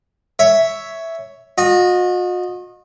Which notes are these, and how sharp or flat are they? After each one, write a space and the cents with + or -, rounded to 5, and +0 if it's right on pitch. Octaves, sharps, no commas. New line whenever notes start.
C#5 +10 E5 +0
F#4 -45 D#5 -10